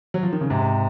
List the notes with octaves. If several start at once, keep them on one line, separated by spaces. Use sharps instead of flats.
F#3
F3
D#3
C#3
G#2 C3